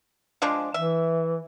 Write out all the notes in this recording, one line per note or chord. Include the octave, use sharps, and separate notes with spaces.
F3 G#3 D4
E3 E5